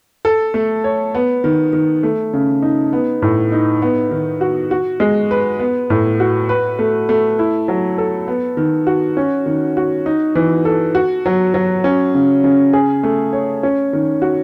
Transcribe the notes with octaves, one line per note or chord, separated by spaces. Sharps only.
A4
A3
C#5
B3
D#3
D#3
A3
C#3
D#4
B3
A2
D#4
B3
D#3
F#4
F#4
G#3
B4
B3
A2
F#4
B4
A3
A3
E4
F#3
A4
B3
D#3
F#4
C#4
D#3
F#4
D#4
E3
A4
F#4
F#3
F#3
C#4
C#3
C#3
G#4
A3
C#5
C#4
D#3
F#4